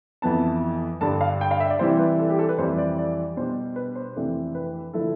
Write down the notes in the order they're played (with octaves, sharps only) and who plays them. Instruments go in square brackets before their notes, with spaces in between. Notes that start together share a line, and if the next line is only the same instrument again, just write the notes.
[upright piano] F2 E3 B3 A5
G2 D3 G3 A5
F5
G5
F5
E5
D5
C3 E3 G3 C4 E4 C5
B4
A4
G4
A4
B4
F2 E3 G3 C4 C5
D5
D5
B2 G3 D4 C5
B4
C5
F2 C3 E3 A3 D4
B4
D3 F3 A3 E4 A4